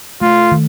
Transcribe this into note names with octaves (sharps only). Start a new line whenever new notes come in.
A3 F4
D#3